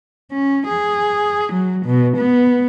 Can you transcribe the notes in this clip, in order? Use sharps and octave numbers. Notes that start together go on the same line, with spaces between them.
C#4
G#4
F#3
B2
B3